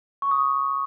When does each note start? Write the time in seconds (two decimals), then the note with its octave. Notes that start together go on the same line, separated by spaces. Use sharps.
0.22 C#6
0.31 D#6